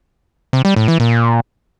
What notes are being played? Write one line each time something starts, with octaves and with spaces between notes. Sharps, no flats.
C3
G3
A2
E3
A#2